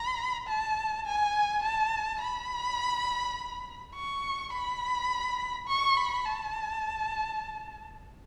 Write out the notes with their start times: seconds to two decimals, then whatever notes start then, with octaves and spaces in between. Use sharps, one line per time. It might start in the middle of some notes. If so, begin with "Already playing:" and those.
Already playing: B5
0.47 A5
1.06 G#5
1.63 A5
2.21 B5
3.95 C#6
4.52 B5
5.68 C#6
5.97 B5
6.26 A5